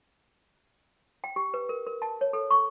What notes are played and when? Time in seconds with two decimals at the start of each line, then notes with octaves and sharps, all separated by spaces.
1.24 G5
1.36 G4
1.54 B4
1.69 A#4
1.87 A#4
2.02 A5
2.21 C#5
2.33 A4
2.50 C#6